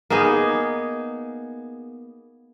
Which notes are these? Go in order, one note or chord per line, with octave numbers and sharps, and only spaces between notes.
A#3 B3 D#4 G#4